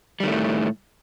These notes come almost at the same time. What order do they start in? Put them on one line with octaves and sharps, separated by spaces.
G3 D#3 A3 A2